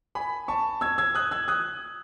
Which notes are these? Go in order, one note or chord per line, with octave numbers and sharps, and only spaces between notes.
G#5 B5
A5 C#6
E6 G#6
E6 G#6
D#6 F#6
E6 G#6
D#6 F#6